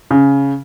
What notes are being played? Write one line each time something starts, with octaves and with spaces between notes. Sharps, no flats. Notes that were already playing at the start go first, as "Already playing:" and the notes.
C#3